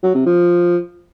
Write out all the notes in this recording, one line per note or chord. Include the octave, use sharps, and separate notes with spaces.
F#3
C3
F3